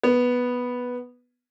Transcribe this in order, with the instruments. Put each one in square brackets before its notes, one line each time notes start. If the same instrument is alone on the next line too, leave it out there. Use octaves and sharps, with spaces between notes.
[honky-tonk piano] B3